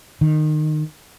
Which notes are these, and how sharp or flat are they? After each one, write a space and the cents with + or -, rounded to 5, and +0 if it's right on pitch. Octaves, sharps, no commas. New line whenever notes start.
D#3 -20